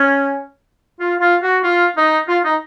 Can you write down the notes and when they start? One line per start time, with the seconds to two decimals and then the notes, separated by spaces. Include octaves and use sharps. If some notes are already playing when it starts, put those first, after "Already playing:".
Already playing: C#4
1.00 F4
1.20 F4
1.43 F#4
1.63 F4
1.96 D#4
2.28 F4
2.44 D#4